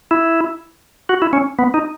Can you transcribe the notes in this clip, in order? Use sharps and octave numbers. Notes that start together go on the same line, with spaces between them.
E4
F#4
E4
C#4
B3
D#4